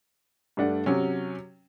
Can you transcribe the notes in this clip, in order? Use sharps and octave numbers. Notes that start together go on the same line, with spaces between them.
G2 A3 D4 F#5
C3 F#3 C#4